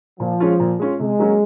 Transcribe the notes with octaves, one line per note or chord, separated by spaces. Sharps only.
A#2 F3
G#3 C#4 F4
A#2
G#3 C#4 F4
C3 G#3
F#3 A#3 C#4 F#4